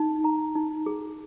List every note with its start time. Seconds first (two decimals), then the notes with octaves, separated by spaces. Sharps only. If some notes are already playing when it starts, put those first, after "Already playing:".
Already playing: D#4
0.24 A#5
0.55 D#4
0.86 G#4